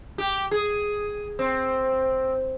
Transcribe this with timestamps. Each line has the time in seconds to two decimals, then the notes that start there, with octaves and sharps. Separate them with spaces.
0.18 G4
0.51 G#4
1.39 C4